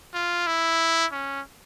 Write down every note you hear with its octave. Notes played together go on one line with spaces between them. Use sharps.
F4
E4
C#4